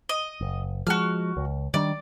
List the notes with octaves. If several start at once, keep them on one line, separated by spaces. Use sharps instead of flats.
D#5
F#1
F3 G#3 F#4 F6
C#2
D#3 G3 D4 D5